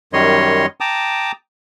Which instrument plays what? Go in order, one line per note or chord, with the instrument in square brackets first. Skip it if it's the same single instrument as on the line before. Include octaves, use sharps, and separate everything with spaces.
[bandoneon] F#2 D#3 G3 C#5 D#5 C6
G5 A5 A#5 D6 D#6